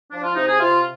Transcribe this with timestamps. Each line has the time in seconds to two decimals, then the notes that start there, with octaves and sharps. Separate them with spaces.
0.12 F3 D4
0.23 F4
0.36 C3 D#4
0.48 G#4
0.60 C3 F4